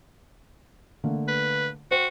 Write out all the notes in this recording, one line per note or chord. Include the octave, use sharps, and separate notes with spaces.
D3 A3 A#3
B4
F#4 C5 G5